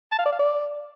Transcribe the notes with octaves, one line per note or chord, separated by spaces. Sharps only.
A5
F5
D5
F5
D5